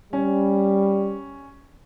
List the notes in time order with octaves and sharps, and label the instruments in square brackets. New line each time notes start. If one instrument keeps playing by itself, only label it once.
[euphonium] G3 [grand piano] C#4